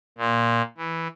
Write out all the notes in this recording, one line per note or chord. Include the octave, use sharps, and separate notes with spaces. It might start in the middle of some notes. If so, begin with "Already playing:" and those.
A#2
E3